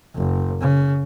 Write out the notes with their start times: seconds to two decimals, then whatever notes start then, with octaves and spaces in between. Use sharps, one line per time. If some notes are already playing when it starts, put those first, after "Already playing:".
0.16 F#1
0.61 C#3